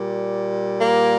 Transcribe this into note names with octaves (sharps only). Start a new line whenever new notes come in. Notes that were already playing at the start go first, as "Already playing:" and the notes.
Already playing: A#2 G3
A#3